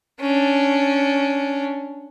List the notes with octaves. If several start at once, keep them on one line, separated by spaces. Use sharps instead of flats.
C#4 D4